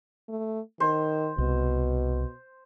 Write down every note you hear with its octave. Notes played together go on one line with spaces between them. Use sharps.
A3
D#3 C5
C2 B2